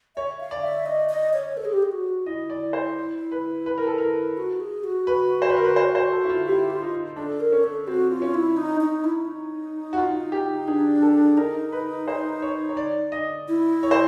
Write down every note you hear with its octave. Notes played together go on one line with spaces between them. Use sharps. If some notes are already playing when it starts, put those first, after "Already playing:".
C#5 E5
F5
D5
E5
D#5
D#5
C#5
A4
G#4
G4
G#4
F#4
E4 D#5
D5
C5
B4
B4
A#4
A4
A#4
F#4
G#4
F#4
B4
C5
B4
A#4
B4
C5
C5
A4
E4
F4
E4 G4
F4
D#4
D4 A4
A#4
C#4
A4
C4 F#4
F4
C#4
E4
D#4
D#4
E4
D#4
F#4
F4
G4
D4 G#4
A4
D#4 A#4
B4
C5
C#5
C#5
D5
D#5
E4
C#5
C5